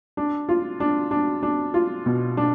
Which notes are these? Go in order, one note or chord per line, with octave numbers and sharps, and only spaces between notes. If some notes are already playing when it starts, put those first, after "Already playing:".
D4
F4
D4
D4
D4
F4
B2
D4